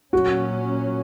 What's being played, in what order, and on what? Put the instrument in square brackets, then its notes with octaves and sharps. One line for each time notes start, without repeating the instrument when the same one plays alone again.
[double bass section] A#2 F#3 C#4 [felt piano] F#4